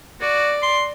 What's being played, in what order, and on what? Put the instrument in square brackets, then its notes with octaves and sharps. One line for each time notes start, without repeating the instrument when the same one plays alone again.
[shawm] F#4 [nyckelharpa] D5
[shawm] C6